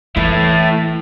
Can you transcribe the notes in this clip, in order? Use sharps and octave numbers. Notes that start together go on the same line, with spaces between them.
E3 A3 E4